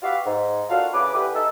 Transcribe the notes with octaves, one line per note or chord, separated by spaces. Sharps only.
F#4 G4 B4 E5 F5
G#2
D4 F4 F#4 A4 A#4 F5
C#3 E3 G#4 B4 D6
D3 E4 G4 G#4 B4
A3 D#4 A4 E6